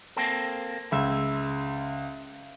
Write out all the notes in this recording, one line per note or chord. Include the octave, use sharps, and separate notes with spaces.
A#3 C4 A4
C#2 E5